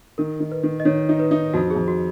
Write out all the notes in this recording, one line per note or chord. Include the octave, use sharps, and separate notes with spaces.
D#3 A#4
D#3
B4
D#3
D#5
D#3 C#5
D#4
B4
D#4
F2 F#4
F2 G#4
F#4